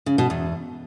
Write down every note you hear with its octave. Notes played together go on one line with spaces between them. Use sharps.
C#3
B2
E2